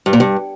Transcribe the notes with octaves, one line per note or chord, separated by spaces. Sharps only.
G2
A#2
G2